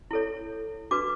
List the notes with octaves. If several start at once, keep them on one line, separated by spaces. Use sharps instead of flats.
E4 A4 C#5
D4 F#4 B4 D6